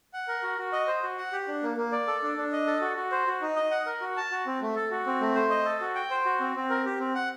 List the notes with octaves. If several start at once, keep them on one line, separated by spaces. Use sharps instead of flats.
F#5
A#4
F#4
F#4
D#5
C5
F#4
F#5
G4
D4
A#3
A#3
D5
A4
D4
D4
D#5
A4
F#4
F#4
C5
F#4
D#4
D#5
F#5
A#4
F#4
A5
F#4
C4
A3
A4
F#4
C4
A3
C5
D#5
A4
F#4
G5
C5
F#4
C4
C4
A#4
G4
C4
F#5